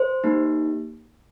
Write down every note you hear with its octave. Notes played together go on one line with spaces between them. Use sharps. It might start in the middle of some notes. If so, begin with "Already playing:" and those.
Already playing: C5
A#3 D#4 G4